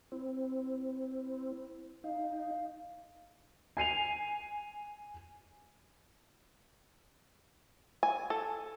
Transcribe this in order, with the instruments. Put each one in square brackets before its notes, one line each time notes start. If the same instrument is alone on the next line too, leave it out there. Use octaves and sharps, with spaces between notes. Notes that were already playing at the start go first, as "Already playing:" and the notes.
[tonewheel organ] C4 [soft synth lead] E4
[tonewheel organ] D#4 [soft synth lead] F5
[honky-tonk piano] G#5 C7 D#7 F7
[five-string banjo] G#5
A4